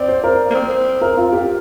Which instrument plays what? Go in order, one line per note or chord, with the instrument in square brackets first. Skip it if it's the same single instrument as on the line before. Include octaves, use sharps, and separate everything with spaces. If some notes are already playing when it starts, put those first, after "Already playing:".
Already playing: [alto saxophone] C4 [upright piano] D5
[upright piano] C5
A#4
[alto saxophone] A#3
C4
[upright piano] A#4
F4
G4